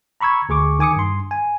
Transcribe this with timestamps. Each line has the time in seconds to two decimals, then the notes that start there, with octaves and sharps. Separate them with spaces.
0.21 A#5 B5 C#6 E6 G#6
0.49 D2 G#4 C#6 D6
0.79 D#3 G#5 D6 D#6 C#7
0.96 G2 C6
1.31 G#5